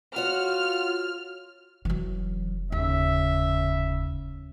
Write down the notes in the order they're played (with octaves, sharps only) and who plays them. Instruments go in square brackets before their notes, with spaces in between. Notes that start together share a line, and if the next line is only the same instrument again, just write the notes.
[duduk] F4 [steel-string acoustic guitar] F#4 C#5 [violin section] F6
[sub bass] F1 [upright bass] E3 F#3
[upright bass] D#2 [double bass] C#3 [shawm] E5